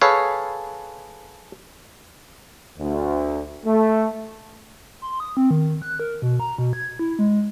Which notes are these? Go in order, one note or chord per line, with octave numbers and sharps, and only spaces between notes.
G#4 A4 B4 C#5 F5
D2
A3
C6
D#6
C4
D#3
F#6
A#4
B2
A#5
B2
G#6
E4
G#3